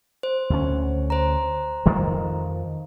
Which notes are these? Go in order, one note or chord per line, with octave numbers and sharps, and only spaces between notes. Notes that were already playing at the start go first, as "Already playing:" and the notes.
C5
D2 C#4
C5 A#5
F2 D#3 F3